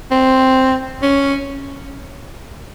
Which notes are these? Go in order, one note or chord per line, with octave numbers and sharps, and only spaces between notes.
C4
C#4